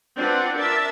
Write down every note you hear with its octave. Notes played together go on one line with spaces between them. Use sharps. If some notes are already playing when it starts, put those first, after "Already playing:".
C4 D4 F4 B4 F#5
D4 A#4 E5 A5